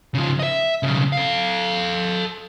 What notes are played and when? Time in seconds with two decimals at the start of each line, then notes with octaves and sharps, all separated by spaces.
0.15 C#3 F3
0.40 D#5 E5
0.83 B1 C#3
1.13 A4 F5